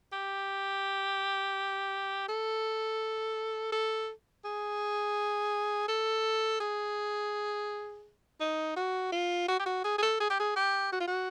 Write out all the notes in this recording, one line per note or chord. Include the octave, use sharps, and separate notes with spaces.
G4
A4
A4
G#4
A4
G#4
D#4
F#4
F4
F#4
G4
F#4
G#4
G#4
A4
G#4
G4
G#4
G4
F#4
F4
F#4